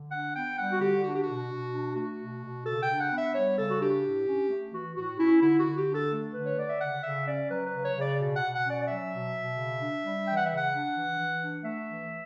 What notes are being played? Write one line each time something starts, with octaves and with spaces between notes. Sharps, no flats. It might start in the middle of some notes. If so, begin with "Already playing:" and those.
Already playing: D3
D4 F#5
B3 G5
G3 F#5
F#4
D3 G4
D4 F#4
G4
F#4
B2
B2
D4
A3 F#4
B2
B2
C#3 A4
G5
D4
F#5
B3
E5
G3 C#5
C#3 A4
F#4
D4 G4
A2
C#4
A3
E3 F#4
A2 F#4
C#4 E4
D3 E4
F#4
D3
G4
D4
A4
A3
D3 B4
C#5
D3 D5
E5
C#3 F#5
C#3 E5
C#4 D5
F#3 B4
B4
C#3
C#5
C#3 D5
B2
F#5
B2
F#5
C#4
D5
D5
F#3 E5
B2
B2
C#3
D4
G3
E3 G5
F#5
C#3 E5
F#5
D4
E3
E3
D4
A3 E5
E3